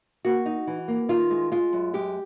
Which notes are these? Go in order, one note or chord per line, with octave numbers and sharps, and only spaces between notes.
A#3 F#4
D#4
E3
A#3
D#3 F4
G#3
G#3 F4
F#2
G#3 G4